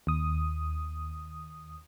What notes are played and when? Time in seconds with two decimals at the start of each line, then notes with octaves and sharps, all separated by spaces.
0.07 D#2 D#6